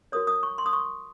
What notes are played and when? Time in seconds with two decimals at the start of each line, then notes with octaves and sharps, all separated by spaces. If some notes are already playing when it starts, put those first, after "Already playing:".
0.12 F#4 A#4 C#5 D#6
0.27 D#6
0.43 C#6
0.58 C6
0.66 D#6
0.73 C#6